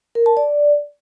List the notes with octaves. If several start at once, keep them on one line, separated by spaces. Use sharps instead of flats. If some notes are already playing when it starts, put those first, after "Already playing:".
A#4
A5
D5